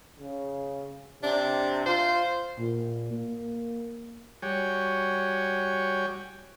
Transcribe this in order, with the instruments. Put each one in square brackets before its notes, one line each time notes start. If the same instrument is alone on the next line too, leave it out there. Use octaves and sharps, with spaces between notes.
[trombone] C#3
[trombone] C3 [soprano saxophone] D4
[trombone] F4 [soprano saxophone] C5
[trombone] A#2
A#3
[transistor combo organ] G3 F#4 C#5 G5 G#5